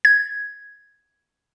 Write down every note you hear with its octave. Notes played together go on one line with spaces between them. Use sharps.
G#6